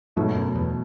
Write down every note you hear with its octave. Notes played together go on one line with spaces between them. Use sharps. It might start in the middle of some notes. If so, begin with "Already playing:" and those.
G#2 B2 F#3 A3
F#2
E2